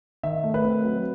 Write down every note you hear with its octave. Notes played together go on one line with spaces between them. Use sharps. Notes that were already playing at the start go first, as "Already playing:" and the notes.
D#3 E5
A3
B4
C4
F#3